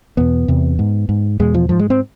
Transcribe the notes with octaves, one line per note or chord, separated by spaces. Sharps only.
E2 B2 B3
E2 C3
G#2
G#2
E2 B2 G#3
F3
G#2 F3
G#3
C4